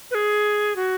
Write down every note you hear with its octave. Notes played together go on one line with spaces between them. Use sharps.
B4
G#4
F#4